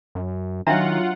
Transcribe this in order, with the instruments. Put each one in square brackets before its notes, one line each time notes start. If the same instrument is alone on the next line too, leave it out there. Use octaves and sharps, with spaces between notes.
[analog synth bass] F#2
[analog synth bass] D#3 [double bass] F#3 [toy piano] D4 E5 A#5 [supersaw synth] F4 F#5